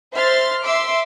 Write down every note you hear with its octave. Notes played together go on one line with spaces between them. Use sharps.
C5 E5 C6 F6 A6
E5 C6 D6 E6